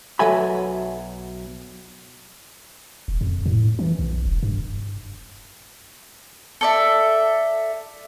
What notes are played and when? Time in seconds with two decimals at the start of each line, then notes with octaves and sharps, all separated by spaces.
0.19 B1 F#3 A4 E5 G#5 B5
3.08 E1
3.21 F2
3.46 A2
3.79 E3
3.99 B1
4.25 E1
4.43 G2
6.61 A4 D5 E5